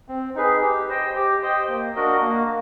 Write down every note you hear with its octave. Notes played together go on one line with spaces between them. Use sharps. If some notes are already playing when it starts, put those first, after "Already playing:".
C4
D#4 G#4 B4
G4
C5 D#5 G5
G4
C5 D#5 G5
A#3
D4 F#4 A#4 D#5
A#3